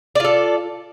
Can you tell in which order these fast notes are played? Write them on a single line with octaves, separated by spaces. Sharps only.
D5 F4 A4